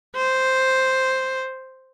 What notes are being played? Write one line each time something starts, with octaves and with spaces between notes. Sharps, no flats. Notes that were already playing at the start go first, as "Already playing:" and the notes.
C5